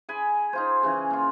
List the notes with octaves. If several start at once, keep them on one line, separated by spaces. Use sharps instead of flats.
G#4 G#5 B5
D#4 F4 C5
C#3 E3 C#4
A#2 F4